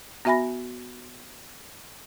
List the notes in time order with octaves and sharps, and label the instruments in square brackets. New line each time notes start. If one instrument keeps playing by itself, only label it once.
[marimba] B3 F#4 E5 G#5 B5 A#6